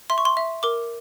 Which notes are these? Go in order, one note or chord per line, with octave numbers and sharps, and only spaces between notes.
E5 C6
C#6
C6
E5
A#4 D6